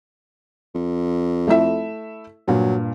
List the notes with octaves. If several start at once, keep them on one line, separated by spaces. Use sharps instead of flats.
F2
A3 E4 E5
G2 A#2 F#3